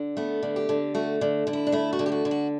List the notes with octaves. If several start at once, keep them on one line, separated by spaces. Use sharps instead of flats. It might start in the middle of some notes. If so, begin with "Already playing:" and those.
Already playing: D3
A3 B3
D3
G4
D3
A3 F#4
D3
D3
E4
D4
A3 E4
F#4
D3
G4
F#4
D3
F#4